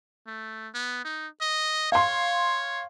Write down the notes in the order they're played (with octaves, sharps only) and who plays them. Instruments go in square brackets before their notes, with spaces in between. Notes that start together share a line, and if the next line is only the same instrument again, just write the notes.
[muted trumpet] A3
B3
D#4
D#5
[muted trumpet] C#5 [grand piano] F5 C6